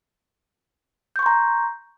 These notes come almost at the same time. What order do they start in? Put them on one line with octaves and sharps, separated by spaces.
G6 C#6 C6 A#5